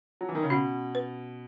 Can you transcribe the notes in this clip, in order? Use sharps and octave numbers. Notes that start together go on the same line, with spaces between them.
F#3
E3
D#3
C#3
B2 C#4
B4